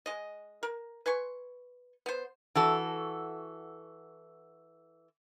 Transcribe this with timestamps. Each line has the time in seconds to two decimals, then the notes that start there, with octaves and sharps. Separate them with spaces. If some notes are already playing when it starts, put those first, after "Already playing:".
0.06 G#3 D#5
0.63 A#4
1.06 B4 G#5 C6 C#6
2.06 B3 C5
2.55 E3 F#4 A4